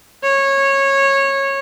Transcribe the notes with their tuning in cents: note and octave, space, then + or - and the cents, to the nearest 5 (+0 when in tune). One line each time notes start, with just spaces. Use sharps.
C#5 -15